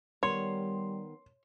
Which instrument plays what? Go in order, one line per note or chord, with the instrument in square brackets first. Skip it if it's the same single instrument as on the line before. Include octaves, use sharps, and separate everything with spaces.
[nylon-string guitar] D#3 B3 A#4 [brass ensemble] G3 [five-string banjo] C#5 [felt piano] C6